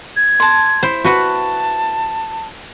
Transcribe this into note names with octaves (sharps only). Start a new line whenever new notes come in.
G#6
A5 C6
E4 C5
F#4 B4 F#5 A5